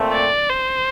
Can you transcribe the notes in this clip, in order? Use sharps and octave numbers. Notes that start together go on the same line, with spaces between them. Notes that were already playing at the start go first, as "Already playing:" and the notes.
Already playing: A#2 A3 C4
D5
C5